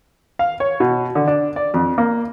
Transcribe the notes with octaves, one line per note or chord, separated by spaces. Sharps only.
F5
C#5
B2
D3
D4
D5
F2
A#3